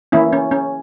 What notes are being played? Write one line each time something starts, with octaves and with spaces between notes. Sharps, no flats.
E3 A#3 C#4 E4
C#4
C#4